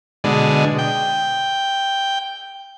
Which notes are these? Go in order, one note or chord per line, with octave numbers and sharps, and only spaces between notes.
B2 D3 G#3
G5